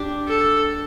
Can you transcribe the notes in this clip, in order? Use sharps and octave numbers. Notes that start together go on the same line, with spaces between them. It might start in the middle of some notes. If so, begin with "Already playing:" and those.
Already playing: D4 G4
A4